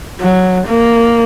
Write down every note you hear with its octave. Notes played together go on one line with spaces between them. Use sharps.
F#3
A#3